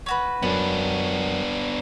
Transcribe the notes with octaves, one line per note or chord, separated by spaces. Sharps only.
C#4 F#4 B4
F#2 B3 D4